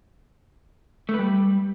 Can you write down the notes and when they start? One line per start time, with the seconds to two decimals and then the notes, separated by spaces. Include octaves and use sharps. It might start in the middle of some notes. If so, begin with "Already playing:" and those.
1.09 A3
1.14 B4
1.19 G3